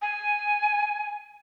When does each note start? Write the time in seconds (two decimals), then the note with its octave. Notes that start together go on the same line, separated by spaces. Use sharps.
0.02 G#5